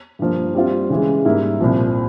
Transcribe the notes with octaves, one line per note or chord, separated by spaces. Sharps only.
G2 F3 A#3
G3 C4 F4
C#3 E3 G#3
G#2 G3 A#3 E4
C2 A#2 F3